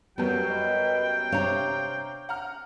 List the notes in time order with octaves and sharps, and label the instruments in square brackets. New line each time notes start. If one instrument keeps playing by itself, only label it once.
[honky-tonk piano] F#2 G3 [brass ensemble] F#3 [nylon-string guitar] B3 [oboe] G5
[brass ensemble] B4 D#5
[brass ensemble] C3 [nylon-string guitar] D4 C#5 [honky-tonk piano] F5 A#5 G6
[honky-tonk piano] F#5 A#5 F6